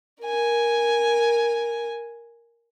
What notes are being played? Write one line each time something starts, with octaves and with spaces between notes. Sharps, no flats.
A#4 G#5